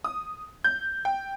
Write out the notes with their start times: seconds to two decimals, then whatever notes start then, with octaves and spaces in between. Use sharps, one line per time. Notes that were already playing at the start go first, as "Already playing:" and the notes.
0.04 D#6
0.64 G6
1.05 G5